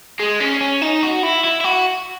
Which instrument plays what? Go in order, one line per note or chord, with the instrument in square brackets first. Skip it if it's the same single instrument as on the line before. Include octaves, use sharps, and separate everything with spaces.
[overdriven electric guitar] G#3
C#4
C#4
D#4
F#4
E4
E4
E4
F#4